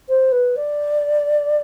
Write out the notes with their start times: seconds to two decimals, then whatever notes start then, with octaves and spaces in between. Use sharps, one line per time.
0.09 C5
0.32 B4
0.56 D5